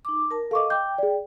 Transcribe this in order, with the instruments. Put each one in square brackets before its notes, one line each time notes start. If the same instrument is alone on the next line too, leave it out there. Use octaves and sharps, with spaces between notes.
[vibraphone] D#4 D6
A#4 A5
[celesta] A4 C#6 D6 [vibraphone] D#5 F5
[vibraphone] G5 [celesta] D6 G6
[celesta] G#4 D5